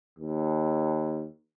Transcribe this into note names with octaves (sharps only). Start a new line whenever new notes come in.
D#2